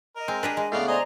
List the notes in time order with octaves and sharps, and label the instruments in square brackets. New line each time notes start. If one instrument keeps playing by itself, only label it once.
[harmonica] A#4 [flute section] D#5
[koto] G#3 [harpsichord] C4
[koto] D4 G4 G#4 [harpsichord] B4
[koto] G#3
[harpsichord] A2 C#3 B3 [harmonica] D5 F5
[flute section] C5 D5 A#5 [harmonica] D#5 G#5 C6